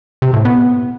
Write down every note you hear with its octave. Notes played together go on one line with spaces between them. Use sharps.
C3
A2
B3